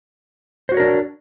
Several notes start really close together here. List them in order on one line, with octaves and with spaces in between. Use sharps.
C5 F#4 C#5 A#4 D4